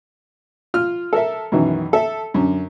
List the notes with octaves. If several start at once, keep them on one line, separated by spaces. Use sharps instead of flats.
F4 F6
A4 A#4 E5
F#2 B2 D#3 E3
A4 E5
F#2 D3